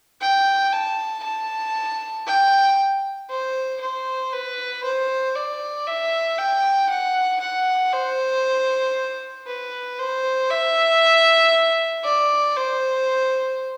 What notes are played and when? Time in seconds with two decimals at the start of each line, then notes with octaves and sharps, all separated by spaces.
0.21 G5
0.72 A5
1.24 A5
2.27 G5
3.30 C5
3.81 C5
4.33 B4
4.84 C5
5.35 D5
5.87 E5
6.38 G5
6.90 F#5
7.41 F#5
7.93 C5
9.47 B4
9.99 C5
10.50 E5
12.04 D5
12.56 C5